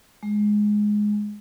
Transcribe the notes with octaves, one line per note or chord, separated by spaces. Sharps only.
G#3